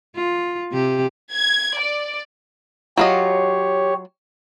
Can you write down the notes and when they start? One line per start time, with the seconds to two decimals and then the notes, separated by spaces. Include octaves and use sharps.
0.15 F4
0.72 C3 G4
1.34 G#6
1.79 D5
2.97 F#3 F4 G4 C#5 D#5